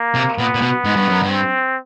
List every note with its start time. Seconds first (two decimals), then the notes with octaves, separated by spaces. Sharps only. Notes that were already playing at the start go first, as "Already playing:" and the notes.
Already playing: A#3
0.15 C3
0.38 A#2 B3
0.54 A#2
0.62 B2
0.85 G#2
0.96 G2
1.09 F#2
1.23 G2
1.30 C4